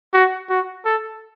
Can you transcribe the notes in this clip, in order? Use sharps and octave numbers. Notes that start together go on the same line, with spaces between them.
F#4
F#4
A4